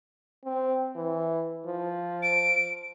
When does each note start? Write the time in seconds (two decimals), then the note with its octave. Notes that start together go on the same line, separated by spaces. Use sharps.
0.44 C4
0.96 E3
1.66 F3
2.22 D7